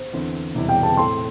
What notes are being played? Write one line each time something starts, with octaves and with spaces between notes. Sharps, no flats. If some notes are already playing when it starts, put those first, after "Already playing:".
Already playing: C5
E2 D3 C4 E4
E1 E2 C3 G3 E4
G5
A5
A2 A3 C4 A4 C6